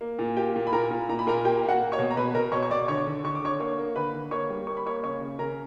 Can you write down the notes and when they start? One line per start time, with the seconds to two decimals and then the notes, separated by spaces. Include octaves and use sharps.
0.01 A#3
0.19 A#2
0.37 A#3 G4 G5
0.56 A#2
0.67 B5
0.73 A#2 A#4 A#5
0.91 A#2
1.09 A#2 A#5
1.19 B5
1.27 A#2 A#4 A#5
1.45 A#3 G4 G5
1.63 A#3
1.69 F#4 F#5
1.81 A#3
1.92 C#5 C#6
1.99 B2
2.10 A#5
2.16 B2 B4 B5
2.34 B2 A#4 A#5
2.52 B2 C#5 C#6
2.63 C#6
2.70 B2 D5 D6
2.88 D3 C#5 C#6
3.07 D3
3.24 D3 C#6
3.35 D6
3.42 D3 C#5 C#6
3.59 A#3 C#5 C#6
3.78 A#3
3.96 D3 B4 B5
4.14 D3
4.31 A#3 C#5 C#6
4.50 G3
4.67 A#3 C#6
4.77 B5
4.86 A#3 C#5 C#6
5.03 C#3 C#5 C#6
5.21 C#3
5.39 C#3 A#4 A#5